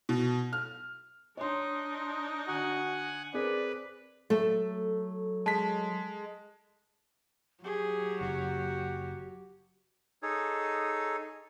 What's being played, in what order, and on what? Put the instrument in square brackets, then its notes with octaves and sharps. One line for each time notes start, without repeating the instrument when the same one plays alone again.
[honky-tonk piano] B2
F6
[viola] D4 D#4 [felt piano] C#5 C6
[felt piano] D3 [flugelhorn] F#4 [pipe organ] F#5 G#5
[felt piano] C4 G#4 A#4 [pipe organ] B4 [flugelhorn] D5
[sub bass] F#3 [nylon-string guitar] A3 [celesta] A4
[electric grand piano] G#3 B6 [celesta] A5
[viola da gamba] F#3 [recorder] G4 [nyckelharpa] G#4
[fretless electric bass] F#1 [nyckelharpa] F#4
[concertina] D#4 G#4 A4 C#5